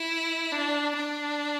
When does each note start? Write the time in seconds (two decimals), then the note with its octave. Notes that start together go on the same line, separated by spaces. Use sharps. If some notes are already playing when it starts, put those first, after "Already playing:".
Already playing: E4
0.52 D4
0.96 D4